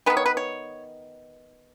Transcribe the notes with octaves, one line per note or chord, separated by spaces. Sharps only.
D#3 G#3 B3 B4
C#5
B4
C#5